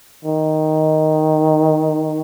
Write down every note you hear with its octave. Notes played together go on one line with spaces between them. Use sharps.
D#3